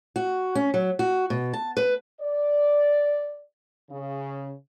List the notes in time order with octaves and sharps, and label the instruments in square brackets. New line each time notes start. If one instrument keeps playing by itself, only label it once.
[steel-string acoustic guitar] F#4
C#4
F#3
F#4
B2
A5
B4
[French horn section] D5
C#3